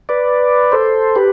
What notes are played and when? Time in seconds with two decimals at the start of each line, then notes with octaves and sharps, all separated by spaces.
0.09 B4 D5
0.72 A4 C5
1.16 G4 B4